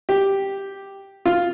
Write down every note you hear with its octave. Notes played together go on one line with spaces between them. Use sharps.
G4
F4